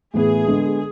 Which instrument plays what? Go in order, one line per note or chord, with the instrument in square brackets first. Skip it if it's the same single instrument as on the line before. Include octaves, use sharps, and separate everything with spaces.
[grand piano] A2 E3 B3 [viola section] G#4
[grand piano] D3 G#3 B3